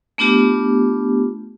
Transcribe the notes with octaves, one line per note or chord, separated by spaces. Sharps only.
A3 B3 D4 F4 G4